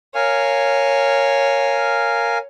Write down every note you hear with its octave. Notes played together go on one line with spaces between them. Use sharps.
A#4 C#5 F5 G#5